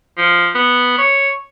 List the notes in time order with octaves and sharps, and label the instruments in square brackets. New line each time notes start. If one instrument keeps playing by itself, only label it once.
[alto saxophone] F3
B3
C#5